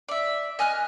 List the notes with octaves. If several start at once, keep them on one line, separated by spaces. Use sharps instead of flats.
D5 E5
D#5 G#5 F6 F#6